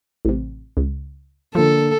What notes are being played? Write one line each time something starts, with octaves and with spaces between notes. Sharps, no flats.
A1 C3
C#2
D3 F3 A#3 A4